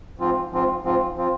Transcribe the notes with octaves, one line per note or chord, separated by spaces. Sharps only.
G#2 F3 C4 F4
G#2 F3 C4 F4
G#2 F3 C4 F4
F3 C4 F4